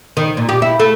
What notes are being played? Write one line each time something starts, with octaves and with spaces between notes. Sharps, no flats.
D#3
A#2
G4
E4
A3